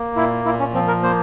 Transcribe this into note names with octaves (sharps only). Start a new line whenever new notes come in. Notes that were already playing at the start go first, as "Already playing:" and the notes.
Already playing: A#3
A#2 E4
A#2 E4
C#4
F3 C4
A#4
A#3 C5